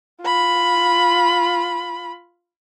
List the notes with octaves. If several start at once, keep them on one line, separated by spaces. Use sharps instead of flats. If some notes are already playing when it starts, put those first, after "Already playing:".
F4 B5